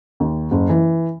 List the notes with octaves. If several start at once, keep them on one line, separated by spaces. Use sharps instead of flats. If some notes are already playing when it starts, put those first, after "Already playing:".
D#2
F#1
E3